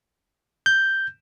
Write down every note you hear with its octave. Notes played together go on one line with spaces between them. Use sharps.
G6